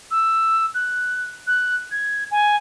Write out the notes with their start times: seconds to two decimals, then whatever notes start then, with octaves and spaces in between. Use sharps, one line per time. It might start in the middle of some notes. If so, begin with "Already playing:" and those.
0.11 E6
0.74 F#6
1.47 F#6
1.91 G#6
2.31 G#5